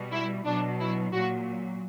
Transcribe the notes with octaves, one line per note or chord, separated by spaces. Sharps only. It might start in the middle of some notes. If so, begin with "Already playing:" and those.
Already playing: B2 G3
E4
B2 F#3 D4
E4
A#2 F#3 F#4